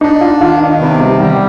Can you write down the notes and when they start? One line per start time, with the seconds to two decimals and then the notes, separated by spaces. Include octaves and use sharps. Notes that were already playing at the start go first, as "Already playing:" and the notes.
0.01 D4 D#4
0.21 F4
0.41 D#3 F4
0.60 D#4
0.80 C3 B3
1.00 G3
1.20 D#3 G3